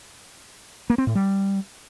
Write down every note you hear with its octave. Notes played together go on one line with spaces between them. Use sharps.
A#3
C4
A2
G3